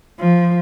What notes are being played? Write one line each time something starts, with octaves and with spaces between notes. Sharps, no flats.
F3